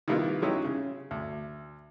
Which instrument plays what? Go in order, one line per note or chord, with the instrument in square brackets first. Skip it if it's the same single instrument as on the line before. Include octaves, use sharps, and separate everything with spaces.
[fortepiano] D#3 G3 A#3 B3 E4 F4
F#3 G#3 C#4 D#4 E4 G4
C#3
D2